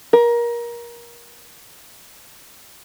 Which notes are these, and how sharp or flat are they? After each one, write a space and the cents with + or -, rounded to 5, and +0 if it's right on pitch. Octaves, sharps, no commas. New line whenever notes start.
A#4 +25